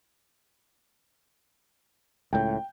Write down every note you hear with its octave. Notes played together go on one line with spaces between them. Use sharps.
C#2 A2 G5 G6